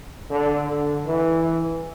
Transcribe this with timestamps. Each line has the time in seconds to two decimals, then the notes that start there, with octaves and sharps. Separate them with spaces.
0.30 D3
0.67 D3
1.06 E3